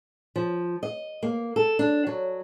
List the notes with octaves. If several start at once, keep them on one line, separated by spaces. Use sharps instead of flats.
F3
D#5
A#3
A4
D4
F#3